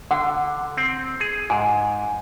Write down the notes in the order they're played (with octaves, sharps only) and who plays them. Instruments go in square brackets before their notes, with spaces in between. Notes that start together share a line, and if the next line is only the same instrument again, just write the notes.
[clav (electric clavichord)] D3 [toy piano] F#5
[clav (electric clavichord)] C4
G#4
[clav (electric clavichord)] G#2 [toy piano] G#5